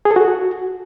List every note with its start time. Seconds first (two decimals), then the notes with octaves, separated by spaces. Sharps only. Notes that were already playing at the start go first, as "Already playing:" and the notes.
0.05 G#4
0.11 A4
0.16 F#4